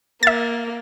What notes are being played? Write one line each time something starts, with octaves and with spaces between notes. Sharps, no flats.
A#3 E5 A6